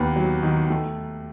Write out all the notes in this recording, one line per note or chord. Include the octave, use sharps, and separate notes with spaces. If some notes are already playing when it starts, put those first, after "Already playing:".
Already playing: D#2 B3
F#3
D#3
A3